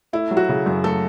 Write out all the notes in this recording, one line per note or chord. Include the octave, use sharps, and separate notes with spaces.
A3 E4
F#3
F#4
C#3
F#2
A3 A4